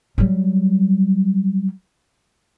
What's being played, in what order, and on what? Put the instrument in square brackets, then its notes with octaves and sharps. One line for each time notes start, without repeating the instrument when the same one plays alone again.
[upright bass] F#3 G3